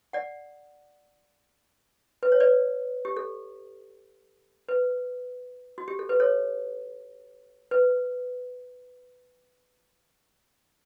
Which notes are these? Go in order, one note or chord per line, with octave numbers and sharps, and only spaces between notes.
D5 F#5
B4
C#5
B4 D5
G4
A4
B4
F#4
G4
A4
B4
A4 C#5
B4